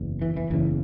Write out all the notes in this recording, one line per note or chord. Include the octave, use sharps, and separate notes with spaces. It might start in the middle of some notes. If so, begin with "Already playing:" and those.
Already playing: F#1 E2
E3
E3
F#1 E2 C#3 E3